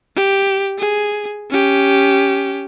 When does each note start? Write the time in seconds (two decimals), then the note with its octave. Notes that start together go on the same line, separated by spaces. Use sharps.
0.16 G4
0.78 G#4
1.50 C#4 G4